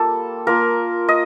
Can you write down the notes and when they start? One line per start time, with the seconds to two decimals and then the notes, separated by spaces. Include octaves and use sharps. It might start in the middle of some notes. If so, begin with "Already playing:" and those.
Already playing: G3 A#3 F4 A4
0.47 A#3 F4 A#4
1.08 D#5